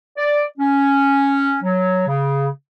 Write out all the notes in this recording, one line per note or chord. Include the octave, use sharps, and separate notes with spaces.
D5
C#4
F#3
C#3